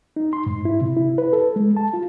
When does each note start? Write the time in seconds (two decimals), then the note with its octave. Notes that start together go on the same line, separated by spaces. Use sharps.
0.16 D#4
0.33 C6
0.46 G#2
0.65 E4
0.81 C3
0.97 E4
1.18 B4
1.33 A4
1.56 G#3
1.77 A5
1.94 F4